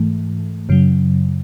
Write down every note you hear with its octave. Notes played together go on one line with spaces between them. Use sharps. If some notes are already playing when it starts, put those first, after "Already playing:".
Already playing: G#2 E3 A3
F#2 C#3 F#3